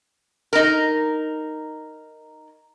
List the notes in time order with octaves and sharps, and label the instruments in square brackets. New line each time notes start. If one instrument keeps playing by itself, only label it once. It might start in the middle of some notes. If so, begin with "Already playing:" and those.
[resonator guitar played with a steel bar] D#4 A#4